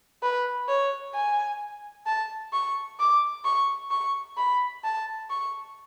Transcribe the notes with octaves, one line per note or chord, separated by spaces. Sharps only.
B4
C#5
G#5
A5
C#6
D6
C#6
C#6
B5
A5
C#6